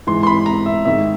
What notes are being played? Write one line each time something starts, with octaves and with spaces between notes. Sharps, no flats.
G#2 E3 C6
C6
B5
A#5
E5
G#2 D#3 E5